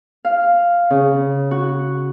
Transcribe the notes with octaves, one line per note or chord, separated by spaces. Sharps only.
F5
C#3
F#4